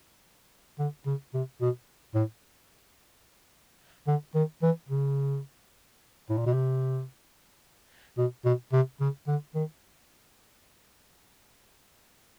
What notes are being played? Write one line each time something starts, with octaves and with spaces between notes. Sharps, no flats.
D3
C#3
C3
B2
A2
D3
D#3
E3
C#3
A2
A#2
B2
C3
B2
B2
C3
C#3
D3
D#3